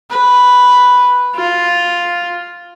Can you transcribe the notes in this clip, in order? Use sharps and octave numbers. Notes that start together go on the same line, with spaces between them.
B4
F4